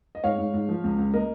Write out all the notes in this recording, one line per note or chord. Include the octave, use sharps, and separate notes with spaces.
D#5
G#2 C#5 F5
G#2
G#2
F3
C#2
C#2
A#3 A#4 D#5